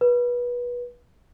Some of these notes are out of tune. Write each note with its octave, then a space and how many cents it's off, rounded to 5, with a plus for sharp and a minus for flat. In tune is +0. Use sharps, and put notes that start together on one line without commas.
B4 -25